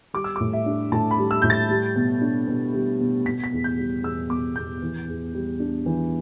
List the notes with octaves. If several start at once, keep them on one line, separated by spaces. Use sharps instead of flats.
G3 D6
E6
A2 D6
E5
D4
A2 A5
B5
G3
E6
A2 G6
A6
G3
B2
D4
B2
G3
B2
B2 B6
B6
E2
G6
G3
E2 E6
B2 D6
E2 G6
E3
E2
G3
D4
E3